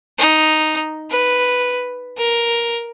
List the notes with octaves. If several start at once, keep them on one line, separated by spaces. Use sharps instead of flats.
D#4
B4
A#4